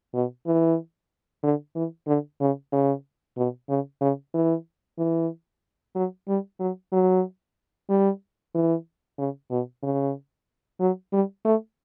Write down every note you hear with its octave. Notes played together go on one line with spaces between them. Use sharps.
B2
E3
D3
E3
D3
C#3
C#3
B2
C#3
C#3
E3
E3
F#3
G3
F#3
F#3
G3
E3
C#3
B2
C#3
F#3
G3
A3